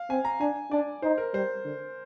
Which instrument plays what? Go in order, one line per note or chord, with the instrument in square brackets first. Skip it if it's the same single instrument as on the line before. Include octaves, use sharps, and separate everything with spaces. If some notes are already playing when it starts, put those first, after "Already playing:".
Already playing: [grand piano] F5
[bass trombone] C4 [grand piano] G#5
[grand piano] A#5
[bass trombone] D4 [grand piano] G#5
[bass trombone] D4 [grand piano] D5
[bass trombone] D#4 [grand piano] C5
[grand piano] A#4
[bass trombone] G3 [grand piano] C5
[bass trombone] D3